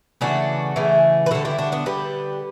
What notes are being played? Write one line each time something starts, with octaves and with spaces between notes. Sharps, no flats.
C#3 E3 A3 D4 F#4
C#3 E3 A3
B4
D3 G3 F#4 A4
E4 G4
D4 F#4
B3 D4
D3 G3 G4 B4